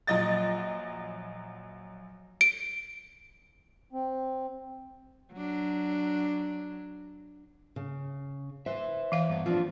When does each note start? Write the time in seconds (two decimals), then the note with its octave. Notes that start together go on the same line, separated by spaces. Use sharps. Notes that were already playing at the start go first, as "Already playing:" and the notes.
0.07 A#1 F#3 D#5 A6
2.41 D7
3.93 C4
5.33 F#3 D4
7.76 C#3
8.66 B4 C5 E5
9.12 E3 F5
9.29 G2 B3
9.46 F3 C4 D4 F4